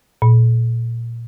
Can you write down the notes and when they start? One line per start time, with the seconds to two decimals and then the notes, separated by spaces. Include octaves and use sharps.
0.22 A#2